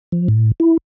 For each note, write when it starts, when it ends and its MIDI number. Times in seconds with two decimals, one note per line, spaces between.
0.12 0.28 53
0.28 0.52 45
0.60 0.77 64